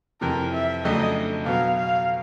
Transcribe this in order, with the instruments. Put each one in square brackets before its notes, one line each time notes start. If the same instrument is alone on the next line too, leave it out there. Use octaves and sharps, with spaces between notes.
[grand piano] F2 C3 E3 [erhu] A#4
[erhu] E5
[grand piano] F2 C#3 F#3 A3 D4 [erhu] D#5
[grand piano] B2 F#3 B3 [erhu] F5
[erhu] F5